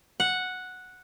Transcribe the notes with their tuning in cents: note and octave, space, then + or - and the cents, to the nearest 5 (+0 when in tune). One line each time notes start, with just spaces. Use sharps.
F#5 -5